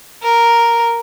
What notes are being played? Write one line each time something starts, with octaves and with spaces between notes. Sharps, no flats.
A#4